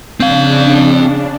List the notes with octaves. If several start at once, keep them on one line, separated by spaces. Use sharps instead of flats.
C#3 C4 D4 F5